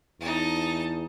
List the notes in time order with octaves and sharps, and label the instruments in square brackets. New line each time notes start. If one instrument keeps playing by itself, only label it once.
[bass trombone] E2 [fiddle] D#4 A5